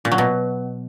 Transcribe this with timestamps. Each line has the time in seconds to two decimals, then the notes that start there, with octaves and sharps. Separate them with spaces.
0.05 A#2
0.12 F#3
0.18 B2